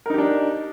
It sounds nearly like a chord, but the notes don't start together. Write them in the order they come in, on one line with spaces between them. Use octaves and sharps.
A#4 D#4 G4 D4